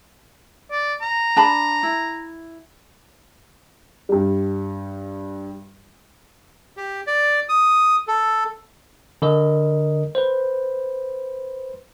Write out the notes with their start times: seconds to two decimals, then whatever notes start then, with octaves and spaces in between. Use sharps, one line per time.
0.71 D5
1.01 A#5
1.36 D4 A5 B5
1.83 E4
4.09 G2 G3
6.77 G4
7.07 D5
7.49 D#6
8.08 A4
9.22 D3 A#4 D#5
10.15 B4 C5